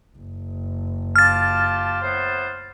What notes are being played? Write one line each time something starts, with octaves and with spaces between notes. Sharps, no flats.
F#1
F4 G4 A5 F6 A6
A2 B3 C5